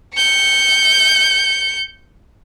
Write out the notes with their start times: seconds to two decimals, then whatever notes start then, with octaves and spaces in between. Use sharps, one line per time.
0.15 G6 C#7